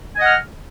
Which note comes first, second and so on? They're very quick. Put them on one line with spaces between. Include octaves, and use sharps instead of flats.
G#5 D#5 F#5 F6